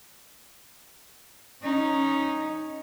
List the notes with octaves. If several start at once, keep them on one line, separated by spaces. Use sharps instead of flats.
C#4 D#4